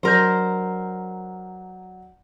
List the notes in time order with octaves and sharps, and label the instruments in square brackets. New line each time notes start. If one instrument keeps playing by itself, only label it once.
[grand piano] F#3 D4 G6 [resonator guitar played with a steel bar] A#4 C5